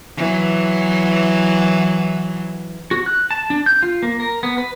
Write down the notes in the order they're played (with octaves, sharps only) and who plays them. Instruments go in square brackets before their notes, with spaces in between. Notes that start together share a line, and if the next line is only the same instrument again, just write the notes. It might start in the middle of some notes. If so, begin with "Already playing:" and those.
[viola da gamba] E3 F#3
[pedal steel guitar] F#4
F#6
A5
D4
G6
F4
A#3
A#4
B3
B4